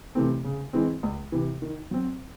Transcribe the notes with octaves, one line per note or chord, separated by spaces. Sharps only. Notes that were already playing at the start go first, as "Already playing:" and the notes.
C3 E3 A3 C4
C#3
E3 G#3 C4
C#2
C3 E3
D#3
F#3 C4